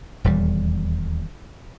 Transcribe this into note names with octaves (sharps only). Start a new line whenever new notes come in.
D#1 E2 G3